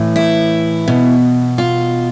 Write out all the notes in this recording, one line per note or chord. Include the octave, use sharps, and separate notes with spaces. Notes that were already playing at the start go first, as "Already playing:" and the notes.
Already playing: A2 E3
E4
B2
F4